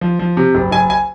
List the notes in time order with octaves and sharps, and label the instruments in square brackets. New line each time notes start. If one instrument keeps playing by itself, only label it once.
[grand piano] F3
F3
C3
F#1
F#1 G#5
G#5